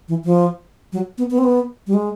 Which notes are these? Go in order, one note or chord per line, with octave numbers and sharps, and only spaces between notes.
E3
F3
F#3
B3
B3
C4
B3
G3
G#3